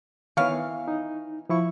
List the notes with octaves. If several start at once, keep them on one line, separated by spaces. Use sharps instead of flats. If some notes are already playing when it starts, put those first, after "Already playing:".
D#3 E3 B3 C#5 F5
D#4
F3 E4 C#6